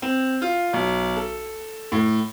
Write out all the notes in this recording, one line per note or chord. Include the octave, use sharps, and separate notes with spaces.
C4
F4
B1
A4
A2